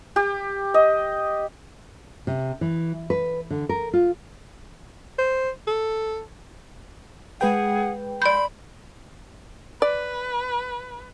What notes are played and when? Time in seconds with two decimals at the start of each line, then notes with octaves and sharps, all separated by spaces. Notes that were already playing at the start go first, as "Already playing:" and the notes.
0.16 G4
0.74 D#5
2.27 C3
2.61 E3
3.10 B4
3.50 D3
3.69 A#4
3.93 F4
5.18 C5
5.67 A4
7.41 G#3 G#4 B4 F#5 G5
8.22 D5 B5 C6 G6
9.82 B4 D5